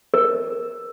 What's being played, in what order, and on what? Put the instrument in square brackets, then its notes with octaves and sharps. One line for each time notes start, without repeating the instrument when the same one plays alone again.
[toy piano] A#4